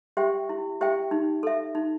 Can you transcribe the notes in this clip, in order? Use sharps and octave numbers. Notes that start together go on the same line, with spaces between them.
G4 C5 E5 G5
E4
G4 C5 E5 G5
D#4
A4 E5
D#4